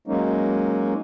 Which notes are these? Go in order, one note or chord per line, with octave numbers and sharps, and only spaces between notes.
F#3 G#3 A#3 C#4 D#4